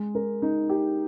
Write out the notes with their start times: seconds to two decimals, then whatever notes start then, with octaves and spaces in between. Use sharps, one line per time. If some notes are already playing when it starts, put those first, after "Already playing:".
Already playing: G#3
0.15 A#4
0.42 D#4
0.69 G4